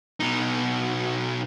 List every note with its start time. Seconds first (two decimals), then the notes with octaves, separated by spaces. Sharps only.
0.20 B2 D#4